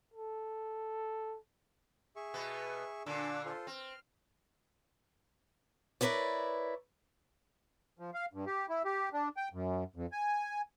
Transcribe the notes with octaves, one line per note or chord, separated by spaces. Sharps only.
A4
G#4 E5 C#6
B2 B3
A#2 D3 D4 D6 E6
F4 A4 C5
C4 F6
E4 A#4 B4 C#5 D5
F3
F5
G2
G4
E4
G4
D4
G5
F#2
F2
G#5